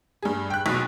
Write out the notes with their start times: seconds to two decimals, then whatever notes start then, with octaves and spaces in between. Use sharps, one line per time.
0.22 G2 G#4
0.50 G5 F#6
0.66 B1 B2